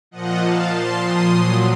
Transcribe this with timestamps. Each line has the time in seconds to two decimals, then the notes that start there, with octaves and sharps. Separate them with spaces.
0.11 A#2 F3 D#5 F#5
0.40 F5 A5
0.71 A5 C6
1.00 C6 D#6
1.30 A#2 F#3